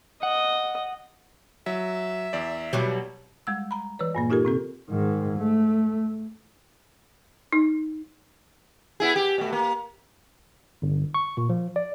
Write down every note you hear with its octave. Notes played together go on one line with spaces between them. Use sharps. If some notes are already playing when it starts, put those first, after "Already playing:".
D#5 F#5
F#3 E5
E2 D5
B2 F#3 G3
G3 G#3 E6
A#5 B5
E3 B4 C#5
G2 A#2 A#3
D#4 F4 G4 A4 A#4
C3 C4 A4
G#2 D#3
A3
D#4
B3 E4 G#4
G4
B2 A3
A#3
G1
C#6
A#2
F3
D5